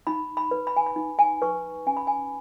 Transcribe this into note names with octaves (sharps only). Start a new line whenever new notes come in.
D#4 B5
B5
B4
B5
G#5
B5
D#4
G#5
B4 C#6
C#4 G#5
B5
G#5